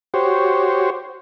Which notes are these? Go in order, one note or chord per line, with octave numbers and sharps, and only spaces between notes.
F#4 G4 C5 C#5